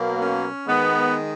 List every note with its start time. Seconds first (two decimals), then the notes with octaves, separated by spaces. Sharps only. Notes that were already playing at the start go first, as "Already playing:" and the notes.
Already playing: B2 F#3 A#3
0.19 C#4
0.66 D#3 G#3 B3